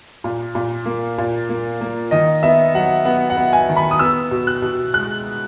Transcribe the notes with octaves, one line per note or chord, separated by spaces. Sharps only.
A#2
A#2
A#3
A#2
A#3
A#3
D#3 D#5
B3 E5
F#3 F#5
B3 F#5
F#5
B3
G#5
D#3
B5
D#6
B3 E6
B2
F#6
B2
G#3 F#6